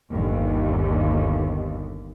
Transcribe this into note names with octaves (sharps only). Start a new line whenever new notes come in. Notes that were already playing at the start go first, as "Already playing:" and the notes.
G1 D#2